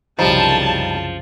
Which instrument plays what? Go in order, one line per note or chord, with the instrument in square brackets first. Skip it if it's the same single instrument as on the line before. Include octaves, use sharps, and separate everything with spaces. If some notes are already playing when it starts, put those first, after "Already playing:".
[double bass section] C2 F#2 C#3 [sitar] F3 [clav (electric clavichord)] G3 D#4 [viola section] A5